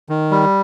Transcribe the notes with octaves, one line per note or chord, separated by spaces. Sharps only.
D#3
G3